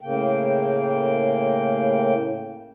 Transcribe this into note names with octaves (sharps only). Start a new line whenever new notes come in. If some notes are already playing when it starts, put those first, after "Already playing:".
A2 C#3 A#3 G5